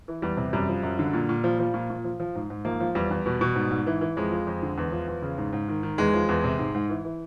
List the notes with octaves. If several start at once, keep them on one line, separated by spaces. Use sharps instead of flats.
E3
E2 G3
C3
F#2 G3
F3
F#2
D3
A#2
A#2
F3
F3
A#2
A#2
F3
F3
G#2
G#2
F3 A#3
F3
E2 G3
E2
B2
B2
G#2
G#2
E3
E3
F2 G#3
F3
F2
D3
E2
F3
E2
C#3
G#2
G#2
D#3
D#3
E2 G#3
F3
E2
C3
G#2
G#2
E3
E3